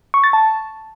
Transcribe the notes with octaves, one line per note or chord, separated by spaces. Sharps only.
C#6
A6
A5